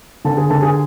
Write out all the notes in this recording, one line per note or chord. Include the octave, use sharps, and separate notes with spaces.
D3 A4 A5
G#4 G#5
D3 A4 A5
G#4 G#5